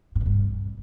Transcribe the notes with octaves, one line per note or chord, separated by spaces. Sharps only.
A2
B2
G2